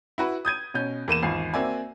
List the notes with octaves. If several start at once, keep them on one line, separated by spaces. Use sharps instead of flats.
E4 F#4 B4
D#6 G6 G#6 D#7
B2 C#4 G6
E2 A#3 D#7 E7
G#1 E2 F4 G#5 C7
A#3 C4 F#4 D5 E5 G#5